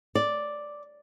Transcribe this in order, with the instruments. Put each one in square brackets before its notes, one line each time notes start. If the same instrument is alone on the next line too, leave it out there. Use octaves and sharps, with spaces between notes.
[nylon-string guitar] D5